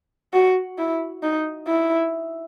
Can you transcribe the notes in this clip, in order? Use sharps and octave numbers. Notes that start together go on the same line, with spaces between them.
F#4
E4
D#4
E4